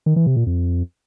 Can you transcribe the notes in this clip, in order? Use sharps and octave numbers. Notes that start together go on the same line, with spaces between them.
D#3
E3
C3
A#2
F2